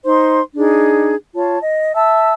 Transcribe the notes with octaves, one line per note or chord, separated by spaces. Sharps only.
D#4 C5 C6
D4 D#4 G#4
F4 C#5 A5
D#5
E5 A5 E6